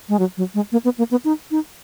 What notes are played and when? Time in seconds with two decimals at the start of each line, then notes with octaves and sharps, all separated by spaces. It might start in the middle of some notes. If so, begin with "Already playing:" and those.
0.09 G#3
0.19 F#3
0.37 F#3
0.55 G#3
0.72 A#3
0.84 B3
0.98 A#3
1.11 B3
1.24 D#4
1.51 D#4